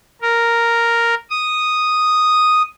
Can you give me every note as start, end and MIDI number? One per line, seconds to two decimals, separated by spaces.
0.21 1.14 70
1.30 2.62 87